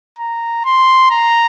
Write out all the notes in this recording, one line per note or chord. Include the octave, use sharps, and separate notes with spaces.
A#5
C6
A#5